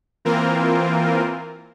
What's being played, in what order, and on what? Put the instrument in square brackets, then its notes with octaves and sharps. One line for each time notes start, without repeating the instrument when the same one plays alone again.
[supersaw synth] E3 A#3 C4 F4 A#4